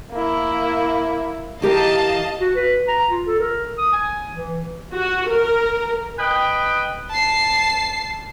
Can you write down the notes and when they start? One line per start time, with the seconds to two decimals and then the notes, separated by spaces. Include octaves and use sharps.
0.12 A#3 E4
1.62 E3 G4 A#4 D#5 F5 A5
2.40 F#4
2.56 B4
2.88 A#5
3.10 F4
3.26 A4
3.40 A#4
3.78 D#6
3.92 G#5
4.31 E3
4.93 F#4
5.29 A#4
6.19 B4 D#5 G5
7.10 A5 C7